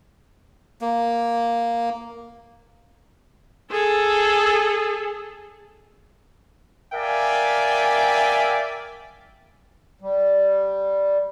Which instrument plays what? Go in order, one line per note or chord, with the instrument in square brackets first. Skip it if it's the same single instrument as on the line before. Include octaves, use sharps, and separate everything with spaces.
[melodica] A#3
[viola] G#4 A4
[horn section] A#4 D5 E5 F5 G5 G#5
[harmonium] G3